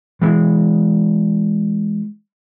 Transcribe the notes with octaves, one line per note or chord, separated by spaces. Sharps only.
E3 G#3